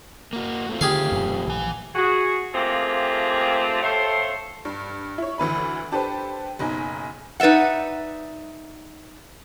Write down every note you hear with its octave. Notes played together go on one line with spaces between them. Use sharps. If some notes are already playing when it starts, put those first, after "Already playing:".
A#3 F#4
A3 C4 F4
D3 D#3 G4 G#4 F5
E1 F#2 A#2
A#1 E3 G#5
F#4 G#4
A3 A#3 C4 F4 G4 G#4
A4 C5 C#5 E5 F5 G5
G2
E4 C#5
D2 E3 B4 B5
D4 G4 A4 B4 C5
F#1 B1 D#4 G#5
D#4 B4 D5 E5 F#5